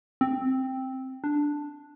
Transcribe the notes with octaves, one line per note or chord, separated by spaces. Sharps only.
C4
D4